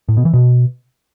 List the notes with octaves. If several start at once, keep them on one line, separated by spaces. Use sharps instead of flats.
A2
B2
E3
B2